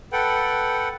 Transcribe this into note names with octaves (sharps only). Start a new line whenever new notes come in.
A4 B4 F#5 G5